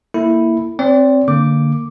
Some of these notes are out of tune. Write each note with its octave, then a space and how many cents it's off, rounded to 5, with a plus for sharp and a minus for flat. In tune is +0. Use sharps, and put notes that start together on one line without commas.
A#3 +0 E4 +0 A4 +0
C4 +10 D5 -40
D3 +0 A#3 -15 D6 +0